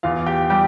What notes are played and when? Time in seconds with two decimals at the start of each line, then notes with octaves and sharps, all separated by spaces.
0.03 E2 F4 F5
0.26 G4 G5
0.50 G3 G4 G5